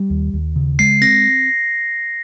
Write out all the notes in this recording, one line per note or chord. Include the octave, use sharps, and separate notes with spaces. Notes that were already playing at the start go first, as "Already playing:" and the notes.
Already playing: G3
D#2
D#2
C#3
G#3 C7
C4 A#6